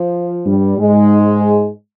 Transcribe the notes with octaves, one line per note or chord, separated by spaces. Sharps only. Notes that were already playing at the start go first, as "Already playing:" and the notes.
Already playing: F3
G2 G3
G#2 G#3